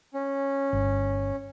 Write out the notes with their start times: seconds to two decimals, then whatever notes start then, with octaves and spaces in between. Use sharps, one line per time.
0.14 C#4
0.73 G1